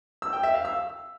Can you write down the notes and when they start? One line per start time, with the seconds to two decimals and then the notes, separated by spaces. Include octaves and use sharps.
0.22 E6
0.33 G5
0.43 E5
0.54 F5
0.65 E6